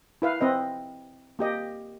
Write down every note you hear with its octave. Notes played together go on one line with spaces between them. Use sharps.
E4 B4 F5
C4 B4 D#5
A#3 G4 D#5